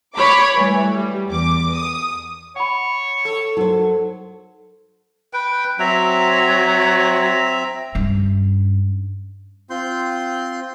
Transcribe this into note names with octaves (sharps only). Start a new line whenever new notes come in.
C#5 B5 D6
E3 G3 A3
G3
E2 D6
D#6
C#5 F#5 B5
A4
F#3 D#4 A#4 C5
B4 G5
F#3 C4 E5 A#5
G2 C#4
C4 F4 C6 G6